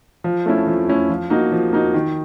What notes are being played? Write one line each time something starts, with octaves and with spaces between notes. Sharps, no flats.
F3
A3 C#4 E4
F3
A3 C#4 E4
F3
A#3 D#4 F#4
F3
A#3 D#4 F#4
D#3